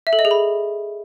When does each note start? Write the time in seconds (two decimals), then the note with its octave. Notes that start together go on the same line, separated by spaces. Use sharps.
0.07 E5
0.13 A4
0.19 D#5
0.25 G#4
0.31 B5